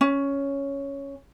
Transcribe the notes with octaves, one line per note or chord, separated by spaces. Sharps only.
C#4